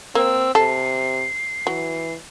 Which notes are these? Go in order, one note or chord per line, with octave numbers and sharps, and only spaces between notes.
A#3 C4 E6
C3 A4 C7
E3 F#3